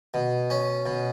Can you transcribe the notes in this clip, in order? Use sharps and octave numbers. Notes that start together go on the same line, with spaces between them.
B2
C#4
B2